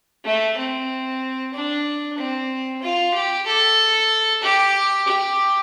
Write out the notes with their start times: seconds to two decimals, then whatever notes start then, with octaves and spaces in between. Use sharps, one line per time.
0.24 A3
0.57 C4
1.53 D4
2.17 C4
2.82 F4
3.14 G4
3.46 A4
4.43 G4
5.07 G4